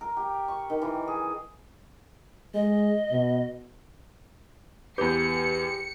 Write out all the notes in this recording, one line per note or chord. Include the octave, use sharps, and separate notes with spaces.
A#4
G4
C#6
D#3
E3
G#4
G#3 D#5
B2
E2 G4 B4 G6 C#7